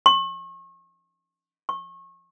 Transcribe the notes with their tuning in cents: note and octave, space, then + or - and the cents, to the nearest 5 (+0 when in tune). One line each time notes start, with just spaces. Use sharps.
C#6 -40
C#6 -30